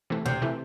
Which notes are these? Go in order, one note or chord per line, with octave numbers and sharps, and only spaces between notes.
C3 E3 A3
D2 C3
C3 E3 A3